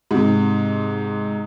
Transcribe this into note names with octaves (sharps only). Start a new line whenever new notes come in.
G#2 C3